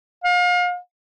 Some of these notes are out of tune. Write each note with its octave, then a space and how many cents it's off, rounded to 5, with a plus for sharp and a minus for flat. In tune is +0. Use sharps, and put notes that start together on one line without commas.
F5 +35